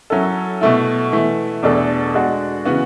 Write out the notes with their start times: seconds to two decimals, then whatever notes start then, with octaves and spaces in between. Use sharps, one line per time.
0.10 F#3 C#4 E4 A4
0.61 B2 A3 E4
1.12 E3 A3 E4
1.63 E2 B2 A3 D4 A4
2.14 G#3 D4 F#4
2.65 C#3 E3 B3 F#4